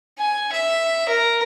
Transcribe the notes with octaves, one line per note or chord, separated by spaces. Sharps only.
G#5
E5
A#4